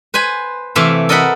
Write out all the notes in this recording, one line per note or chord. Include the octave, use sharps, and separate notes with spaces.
B4 C5 G#5 B5
C3 E3 A3 E5 F5
A4 A#4 D#5 E5 F#5 B5